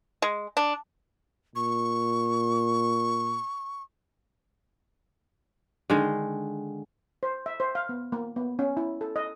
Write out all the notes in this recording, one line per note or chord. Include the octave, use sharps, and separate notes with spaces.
G#3
D4
A#2 C#6
D3 D#3 G#3
C5
E5
C5
F5
B3
A#3
B3
C#4
E4
A4
D#5